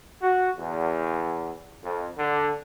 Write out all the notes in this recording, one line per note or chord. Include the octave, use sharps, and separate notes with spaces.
F#4
E2
F2
D3